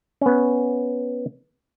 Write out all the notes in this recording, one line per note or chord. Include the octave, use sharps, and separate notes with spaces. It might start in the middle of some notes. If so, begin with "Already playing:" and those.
B3 C#4